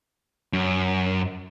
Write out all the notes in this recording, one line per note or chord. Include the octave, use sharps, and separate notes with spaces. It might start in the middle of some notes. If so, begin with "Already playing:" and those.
F#2